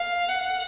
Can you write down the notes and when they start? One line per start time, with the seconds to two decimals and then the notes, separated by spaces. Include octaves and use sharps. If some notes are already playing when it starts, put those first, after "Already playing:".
Already playing: F5
0.28 F#5